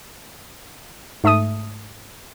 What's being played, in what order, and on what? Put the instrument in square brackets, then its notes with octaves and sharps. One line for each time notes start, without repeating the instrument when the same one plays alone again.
[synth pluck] G#2 A3 E5 A5 D#6 D#7